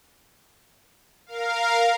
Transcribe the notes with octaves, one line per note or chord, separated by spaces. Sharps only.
A#4 F5